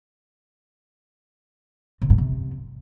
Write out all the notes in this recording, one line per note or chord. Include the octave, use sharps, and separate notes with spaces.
C3
G2
C3